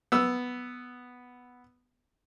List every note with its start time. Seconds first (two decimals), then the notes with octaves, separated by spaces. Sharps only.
0.12 B3 E6